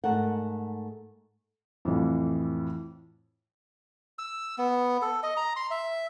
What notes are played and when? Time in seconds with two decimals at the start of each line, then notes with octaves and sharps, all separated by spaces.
0.04 G#2 A3 A#4 F#5
1.85 F2 A2 E3
4.19 E6
4.58 B3
5.02 A4
5.23 D#5
5.37 A#5
5.56 C6
5.71 E5